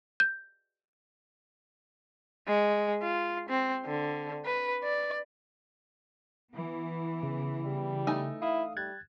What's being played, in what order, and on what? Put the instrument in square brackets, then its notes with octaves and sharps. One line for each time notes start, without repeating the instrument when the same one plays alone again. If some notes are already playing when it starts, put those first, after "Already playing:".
[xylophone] G6
[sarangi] G#3
F4
C4
D3
B4
D5
[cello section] E3 B3
[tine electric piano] C#3
[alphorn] G3
[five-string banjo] A3 D#4 G#5
[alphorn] E4 [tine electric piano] F5 D#6
[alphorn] G3 [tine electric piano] F#6 G#6 A6